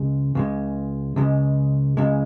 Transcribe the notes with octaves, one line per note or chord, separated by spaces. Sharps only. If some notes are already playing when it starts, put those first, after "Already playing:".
Already playing: C#2 C#3 G#3
C#2 C#3 G#3
C#2 C#3 G#3
C#2 C#3 G#3